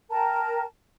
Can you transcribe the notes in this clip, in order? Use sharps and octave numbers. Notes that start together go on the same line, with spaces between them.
A#4 G5 A5 A#5